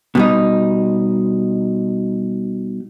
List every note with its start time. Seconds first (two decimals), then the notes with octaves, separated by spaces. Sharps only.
0.15 B2 G3 D#4